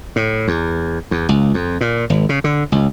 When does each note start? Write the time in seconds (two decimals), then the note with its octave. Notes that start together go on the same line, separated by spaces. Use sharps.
0.16 A2
0.48 E2
1.11 E2
1.29 C#2
1.54 F2
1.81 A#2
2.10 G#1
2.29 C#3
2.44 D3
2.72 C#2